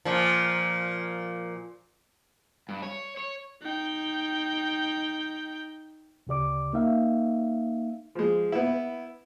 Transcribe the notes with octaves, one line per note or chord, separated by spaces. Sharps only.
A#2 F3
G2
C#5
C#5
D#4 G5
D2 C#3 G4 D5 D6
A#3 D#4 E5 F5
F3 G#3
B3 E4